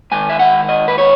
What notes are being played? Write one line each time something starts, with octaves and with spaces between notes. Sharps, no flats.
G#2 D#3 G#5
E5
F#5
D#5
B4
C#5